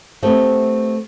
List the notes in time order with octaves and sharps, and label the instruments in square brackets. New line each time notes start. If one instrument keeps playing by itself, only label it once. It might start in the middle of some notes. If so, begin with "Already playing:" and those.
[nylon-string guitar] A3 B3 C4 G4 E5